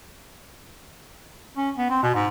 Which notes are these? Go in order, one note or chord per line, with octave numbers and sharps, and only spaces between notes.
C#4
B3
C4
B2
G#2